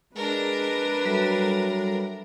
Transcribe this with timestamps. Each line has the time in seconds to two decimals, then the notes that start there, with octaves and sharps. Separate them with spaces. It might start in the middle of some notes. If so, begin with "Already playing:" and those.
0.16 G#3 D4 A#4 B4
1.05 F#3 G3 A4 E5